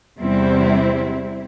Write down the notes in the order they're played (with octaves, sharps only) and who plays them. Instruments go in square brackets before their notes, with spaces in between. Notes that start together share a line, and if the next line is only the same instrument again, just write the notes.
[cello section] E2 C3 G3 C4 E4